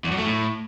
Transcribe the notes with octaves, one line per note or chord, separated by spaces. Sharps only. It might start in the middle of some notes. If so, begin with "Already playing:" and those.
E2
F#2
A3
A2